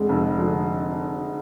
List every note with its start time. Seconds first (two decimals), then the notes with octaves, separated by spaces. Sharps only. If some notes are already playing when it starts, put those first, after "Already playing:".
Already playing: F2 D3 G#3
0.09 F1
0.39 D3